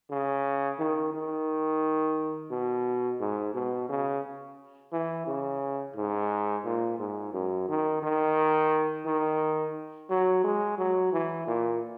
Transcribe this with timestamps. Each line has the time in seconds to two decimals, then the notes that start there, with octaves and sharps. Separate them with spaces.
0.10 C#3
0.79 D#3
1.13 D#3
2.51 B2
3.20 G#2
3.54 B2
3.89 C#3
4.92 E3
5.27 C#3
5.96 G#2
6.65 A#2
6.99 G#2
7.33 F#2
7.69 D#3
8.03 D#3
9.06 D#3
10.10 F#3
10.44 G#3
10.78 F#3
11.13 E3
11.47 A#2